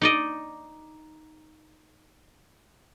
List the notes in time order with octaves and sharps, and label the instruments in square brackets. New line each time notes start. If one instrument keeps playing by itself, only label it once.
[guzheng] D#4 D5 D#5